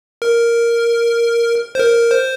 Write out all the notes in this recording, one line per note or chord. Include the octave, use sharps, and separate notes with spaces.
A#4
C5
A#4
C5